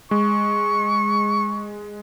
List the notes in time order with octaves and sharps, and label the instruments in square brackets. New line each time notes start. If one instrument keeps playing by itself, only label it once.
[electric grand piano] G#3 [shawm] C#6